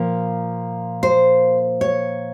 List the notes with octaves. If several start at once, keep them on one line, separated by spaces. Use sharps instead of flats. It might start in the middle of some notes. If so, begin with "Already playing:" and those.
Already playing: A#2 F3 A#3
C5
C#5